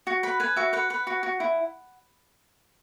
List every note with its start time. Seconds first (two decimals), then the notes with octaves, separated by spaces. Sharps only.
0.07 F#4
0.23 B4 B5
0.40 B4 G#5
0.56 F#4 E5
0.73 B4 F#5
0.90 B4
1.07 F#4
1.23 F#4
1.40 E4